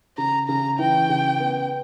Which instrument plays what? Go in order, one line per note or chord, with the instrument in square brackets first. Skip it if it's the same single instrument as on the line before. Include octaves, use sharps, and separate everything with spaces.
[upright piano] C#3 [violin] A#5
[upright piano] C#3 [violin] A#5
[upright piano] E3 [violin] G5
[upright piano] C#3
B3